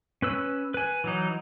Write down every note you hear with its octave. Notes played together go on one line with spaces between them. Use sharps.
C#4 B4 E6
B4 G#5
E3 F#3 D#4